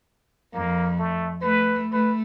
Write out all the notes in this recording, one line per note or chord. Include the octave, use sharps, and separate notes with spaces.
F2 A#3
A3
A3 B4
A3 B4